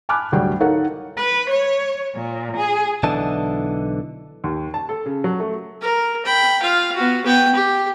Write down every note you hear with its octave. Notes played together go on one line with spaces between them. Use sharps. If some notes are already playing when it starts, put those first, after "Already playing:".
G#5 A5 B5 D6 F6 F#6
D2 F#3 G3 G5
D#4 A4 A#4 C#5 F5 F#5
B4
C#5
A#2
G#4
B1 D3 E3 D#5 A5
D#2
A5
A4
C#3
F#3
A3
A#4
G5 B5
F4 F5
B3 F#4
B3 G5
G4